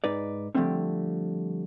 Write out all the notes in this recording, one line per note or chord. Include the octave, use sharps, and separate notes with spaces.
G#2 D#4 B4 D5
D3 F3 G3 A3 C4 C#4